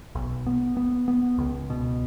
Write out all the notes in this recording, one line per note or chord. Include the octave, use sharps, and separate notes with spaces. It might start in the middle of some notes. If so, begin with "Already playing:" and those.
B1
B3
B3
B3
C#2
B2